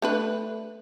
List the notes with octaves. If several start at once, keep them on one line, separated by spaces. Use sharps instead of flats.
A3 D4 B4